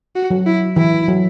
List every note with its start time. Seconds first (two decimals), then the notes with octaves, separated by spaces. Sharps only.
0.16 F#4
0.31 F#3
0.46 E4
0.76 E3 E4
1.08 F#3